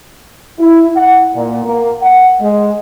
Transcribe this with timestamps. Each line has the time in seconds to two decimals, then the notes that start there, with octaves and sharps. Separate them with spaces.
0.60 E4
0.96 F#5
1.35 A#2
1.65 A#3
2.02 F#5
2.41 G#3